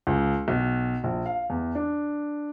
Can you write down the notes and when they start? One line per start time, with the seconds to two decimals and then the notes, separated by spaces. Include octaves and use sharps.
0.07 C#2
0.48 B1
1.04 A#1
1.26 F5
1.50 E2
1.75 D4